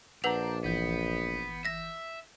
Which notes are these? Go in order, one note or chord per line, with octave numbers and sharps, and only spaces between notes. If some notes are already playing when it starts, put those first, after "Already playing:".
A#1 D4 B4 F#5 A#5 G6 C7 F7
G1 E3 B3 G6
E5 A#6 B6